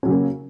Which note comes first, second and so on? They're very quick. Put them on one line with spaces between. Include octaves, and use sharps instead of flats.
C#4 F#3 C#3 A#3